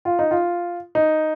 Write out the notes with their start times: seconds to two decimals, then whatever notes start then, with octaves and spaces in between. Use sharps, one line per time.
0.05 F4
0.19 D#4
0.31 F4
0.95 D#4